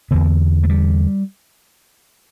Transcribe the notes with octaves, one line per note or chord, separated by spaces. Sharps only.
E2 D3 B3
A3
G3